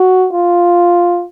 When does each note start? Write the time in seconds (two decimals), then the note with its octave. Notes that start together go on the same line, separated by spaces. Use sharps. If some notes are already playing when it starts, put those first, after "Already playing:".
Already playing: F#4
0.33 F4